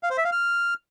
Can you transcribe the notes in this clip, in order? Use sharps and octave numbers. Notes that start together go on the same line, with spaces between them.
F5
C5
E5
F5
F6